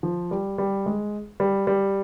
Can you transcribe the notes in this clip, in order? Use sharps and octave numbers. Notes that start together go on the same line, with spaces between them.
F3
G3
G3
G#3
G3
G3